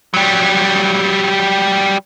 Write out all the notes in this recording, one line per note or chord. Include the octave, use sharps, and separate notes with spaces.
F#3 G3